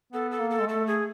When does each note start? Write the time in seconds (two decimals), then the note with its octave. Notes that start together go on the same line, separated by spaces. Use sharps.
0.13 B3 A4
0.31 A4
0.40 A#3
0.50 A4
0.61 G#3
0.68 A3 A4
0.86 G#4